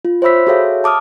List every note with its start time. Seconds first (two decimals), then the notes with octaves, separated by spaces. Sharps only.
0.05 F4
0.22 C5 C#5 E5 B5 E6 B6
0.47 F#4 G#4 A4 C#5 E5 F5
0.84 A5 D6 D#6 F6